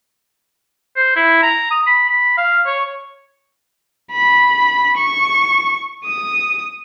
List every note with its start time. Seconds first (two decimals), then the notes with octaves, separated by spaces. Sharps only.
0.96 C5
1.16 E4
1.42 A#5
1.71 D#6
1.87 B5
2.09 B5
2.37 F5
2.66 C#5
4.12 B5
4.97 C#6
6.05 D#6